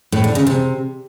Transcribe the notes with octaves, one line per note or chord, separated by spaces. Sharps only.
A2
D3
C#3
C3